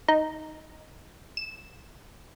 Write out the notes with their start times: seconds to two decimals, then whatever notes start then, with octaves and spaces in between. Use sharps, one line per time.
0.08 D#4
1.37 E7